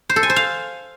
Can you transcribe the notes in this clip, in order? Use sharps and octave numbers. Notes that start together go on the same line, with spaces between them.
C5
A4
G#5
C5
F5